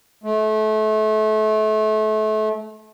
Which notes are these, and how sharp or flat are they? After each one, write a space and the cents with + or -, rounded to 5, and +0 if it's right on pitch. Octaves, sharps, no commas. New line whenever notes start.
A3 -30